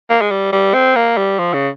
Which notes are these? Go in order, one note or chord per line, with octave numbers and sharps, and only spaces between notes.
A#3
G#3
G3
G3
C4
A#3
G3
F3
C#3